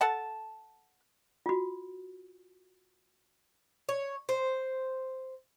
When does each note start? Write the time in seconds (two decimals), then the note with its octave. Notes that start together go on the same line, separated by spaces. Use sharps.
0.01 A4 F#5 A5
1.46 F4 F#4
3.89 C#5
4.29 C5